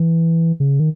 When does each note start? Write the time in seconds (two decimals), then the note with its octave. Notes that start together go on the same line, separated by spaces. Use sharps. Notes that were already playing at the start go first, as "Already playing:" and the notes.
Already playing: E3
0.60 C#3
0.80 D#3